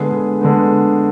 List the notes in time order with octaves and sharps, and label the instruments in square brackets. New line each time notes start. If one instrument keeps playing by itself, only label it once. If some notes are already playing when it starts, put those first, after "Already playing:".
Already playing: [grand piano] D3 G#3 B3 G#4
G#4
D3 G#3 B3